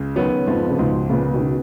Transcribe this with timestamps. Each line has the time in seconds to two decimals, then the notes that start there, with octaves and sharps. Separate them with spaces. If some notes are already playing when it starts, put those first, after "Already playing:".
Already playing: C#2 C#3
0.16 D#3 F#3 B3
0.47 F2 G#2 F3
0.70 C#3
0.78 C#2 G#2 B2
1.09 A#2 C#3 B3
1.33 B2 D#3
1.41 C#3